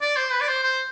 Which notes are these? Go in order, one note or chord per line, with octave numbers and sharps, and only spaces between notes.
D5
C5
B4
D5
C5
C5